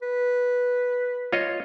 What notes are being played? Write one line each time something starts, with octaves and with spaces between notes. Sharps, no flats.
B4
F4 C#5 D#5